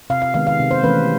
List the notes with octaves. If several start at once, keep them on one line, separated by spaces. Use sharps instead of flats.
C3 F5
F5
D#3 G#3 B3 F5
F5
C3
C5
E3 A3 C#4 B4